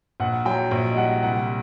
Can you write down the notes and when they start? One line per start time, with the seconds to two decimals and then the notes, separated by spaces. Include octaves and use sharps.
0.20 A#1 F#5
0.45 F#3 G5
0.71 A#1
0.90 D#5
0.96 G3 F#5
1.22 C2 F#5